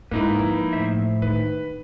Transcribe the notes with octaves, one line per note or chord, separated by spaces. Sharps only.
G#2 A#3 D#4 E4 B4
F3
A2 C5 E5
D#3 B4